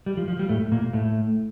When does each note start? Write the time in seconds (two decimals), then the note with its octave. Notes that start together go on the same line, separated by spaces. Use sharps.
0.06 G3
0.17 F3
0.28 F3
0.39 G3
0.49 A2 A3
0.72 A#2 A#3
0.93 A2 A3